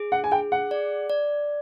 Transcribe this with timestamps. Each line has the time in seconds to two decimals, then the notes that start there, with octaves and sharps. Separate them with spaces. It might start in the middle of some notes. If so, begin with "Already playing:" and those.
Already playing: G#4
0.12 F#5
0.24 G#5
0.31 G#4 G5
0.52 F#5
0.71 D5
1.10 D5